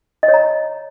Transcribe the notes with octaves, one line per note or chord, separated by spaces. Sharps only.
D#5
C#5
A#5